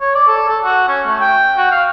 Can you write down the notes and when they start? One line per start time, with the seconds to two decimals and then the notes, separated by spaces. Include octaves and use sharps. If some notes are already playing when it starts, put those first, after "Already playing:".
0.01 C#5
0.15 D5
0.27 A4
0.48 A4
0.64 F#4
0.88 C#4
1.07 A3
1.20 G5
1.57 F#4
1.71 F5